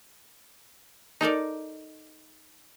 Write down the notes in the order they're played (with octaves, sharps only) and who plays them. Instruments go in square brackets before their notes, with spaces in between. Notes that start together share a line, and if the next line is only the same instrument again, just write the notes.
[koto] D#4 A4 A#4 D5